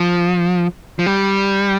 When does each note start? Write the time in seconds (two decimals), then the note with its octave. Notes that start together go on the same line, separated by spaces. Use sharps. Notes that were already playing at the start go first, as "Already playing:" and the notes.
Already playing: F3
0.99 F3
1.06 G3